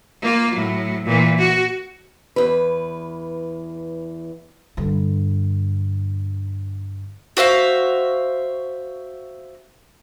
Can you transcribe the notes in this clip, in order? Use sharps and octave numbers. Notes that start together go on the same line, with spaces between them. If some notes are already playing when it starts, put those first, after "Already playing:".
A#3 F4
A2 F#3
A#2 E3
F#4
E2 B4
G2 D3
F#4 C5 E5 F5